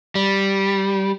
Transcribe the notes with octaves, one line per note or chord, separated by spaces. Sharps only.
G3